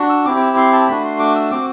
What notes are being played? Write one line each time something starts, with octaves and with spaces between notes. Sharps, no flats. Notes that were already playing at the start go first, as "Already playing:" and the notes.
Already playing: D4 F#4
E6
C4 E4 G4 D6
D6
E6
C6
A5
A3 D4 F#4 B5
C6
D6
E6
C4 F#4 D6